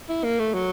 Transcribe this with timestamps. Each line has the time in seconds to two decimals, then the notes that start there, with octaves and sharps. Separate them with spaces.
0.09 E4
0.24 A#3
0.39 A3
0.54 F#3